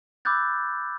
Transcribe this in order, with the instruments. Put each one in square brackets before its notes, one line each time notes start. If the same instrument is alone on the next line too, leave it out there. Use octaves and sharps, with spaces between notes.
[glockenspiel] B5 D6 E6 F#6 G6 A6